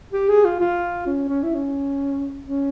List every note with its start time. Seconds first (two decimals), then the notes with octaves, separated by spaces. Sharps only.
0.13 G4
0.29 G#4
0.45 F4
0.60 F4
1.07 C#4
1.29 C#4
1.43 E4
1.55 C#4
2.46 C#4